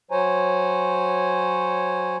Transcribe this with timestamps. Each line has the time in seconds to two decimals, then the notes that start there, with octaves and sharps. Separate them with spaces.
0.11 F#3 C5 C#5 G#5 A#5